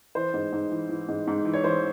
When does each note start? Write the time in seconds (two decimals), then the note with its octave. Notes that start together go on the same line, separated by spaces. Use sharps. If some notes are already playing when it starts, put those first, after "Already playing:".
0.15 E3 C5
0.34 G#2
0.52 G#2
0.71 E3
0.89 E3
1.08 G#2
1.27 G#2
1.45 E3
1.54 C#5
1.64 E3 C5